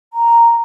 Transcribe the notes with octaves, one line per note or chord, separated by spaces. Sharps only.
A#5